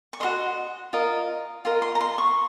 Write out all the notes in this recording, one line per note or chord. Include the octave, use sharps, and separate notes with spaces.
C#6
F#4 A#4 D#5 C6
F4 A#4 D#5
F4 A#4 D#5 C6
C6
A#5
C6
C#6